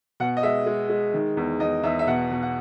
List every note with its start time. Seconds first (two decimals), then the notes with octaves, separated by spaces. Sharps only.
0.20 B2 F#5
0.37 D#5
0.43 G#3 E5
0.66 G#3
0.89 G#3
1.14 D#3
1.37 E2
1.60 E2 D#5
1.83 E2 E5
1.99 E5
2.07 B2 F#5
2.31 B2
2.42 F#5